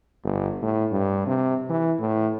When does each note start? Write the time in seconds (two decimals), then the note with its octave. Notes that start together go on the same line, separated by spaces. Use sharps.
0.24 G1
0.62 A2
0.91 G2
1.26 C3
1.70 E3
1.99 A2